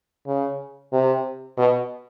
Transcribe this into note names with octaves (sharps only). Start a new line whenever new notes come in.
C#3
C3
B2